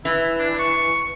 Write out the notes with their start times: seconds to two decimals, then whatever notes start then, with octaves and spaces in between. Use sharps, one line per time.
0.05 E3 E4
0.39 D4
0.59 C#6